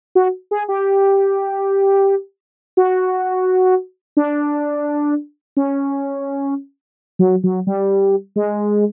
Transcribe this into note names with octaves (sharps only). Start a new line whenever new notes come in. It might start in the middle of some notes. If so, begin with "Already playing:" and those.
F#4
G#4
G4
F#4
D4
C#4
F#3
F#3
G3
G#3